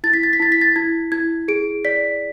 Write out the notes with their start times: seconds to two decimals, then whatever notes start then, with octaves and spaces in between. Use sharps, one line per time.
0.04 E4 A6
0.13 B6
0.23 A6
0.33 B6
0.40 E4 A6
0.52 B6
0.61 A6
0.76 E4 G#6
1.12 E4 G#6
1.48 G#4 D7
1.85 D5 B6